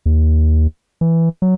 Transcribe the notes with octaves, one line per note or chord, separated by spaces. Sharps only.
D#2
E3
F#3